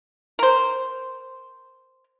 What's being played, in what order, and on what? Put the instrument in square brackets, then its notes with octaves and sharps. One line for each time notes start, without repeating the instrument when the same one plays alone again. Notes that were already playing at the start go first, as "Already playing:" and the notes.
[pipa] A#4 C5